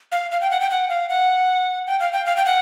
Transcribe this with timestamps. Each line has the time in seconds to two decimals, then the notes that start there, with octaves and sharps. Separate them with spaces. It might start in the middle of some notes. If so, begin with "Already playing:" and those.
0.12 F5
0.31 F5
0.41 G5
0.51 F#5
0.61 G5
0.70 F#5
0.89 F5
1.09 F#5
1.87 G5
2.00 F5
2.13 G5
2.26 F5
2.37 G5
2.45 F#5